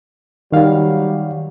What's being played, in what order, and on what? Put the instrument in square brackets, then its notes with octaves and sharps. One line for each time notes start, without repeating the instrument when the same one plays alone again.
[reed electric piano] D#3 F5 [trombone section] F#3 G3